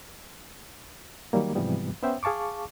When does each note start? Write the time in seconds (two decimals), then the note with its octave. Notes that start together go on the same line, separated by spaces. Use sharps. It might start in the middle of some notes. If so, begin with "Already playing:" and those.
1.33 D#3 F#3 G3 A#3
1.55 G#2 C3 E3 F3 G3 B3
2.03 B3 C#4 C5 E5 G5
2.23 G#4 F5 A5 C#6 D6